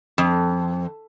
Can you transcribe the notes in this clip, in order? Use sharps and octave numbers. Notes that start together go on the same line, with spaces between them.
F2